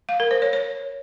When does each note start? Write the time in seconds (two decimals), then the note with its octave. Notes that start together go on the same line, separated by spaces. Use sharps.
0.09 F5
0.20 A#4
0.31 C5
0.42 C#5
0.53 C#5